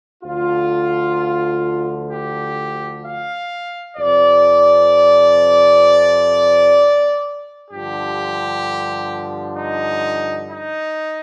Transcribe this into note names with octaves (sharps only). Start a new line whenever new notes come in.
D2 D3 F3 F4
G4
F5
F2 C3 F3 D5
G2 D3 F3 G4
D#4
D#4